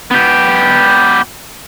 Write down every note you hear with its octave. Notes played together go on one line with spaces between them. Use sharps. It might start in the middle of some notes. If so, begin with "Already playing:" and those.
B3 G4